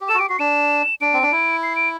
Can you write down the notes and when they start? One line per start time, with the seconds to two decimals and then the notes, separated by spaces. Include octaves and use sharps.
0.01 G4
0.09 A4 E7
0.14 F#4
0.19 G4 D7
0.29 F#4 C7
0.39 D4 E7
1.01 D4 D7
1.14 C4
1.22 D4
1.32 E4
1.63 C7
1.76 D7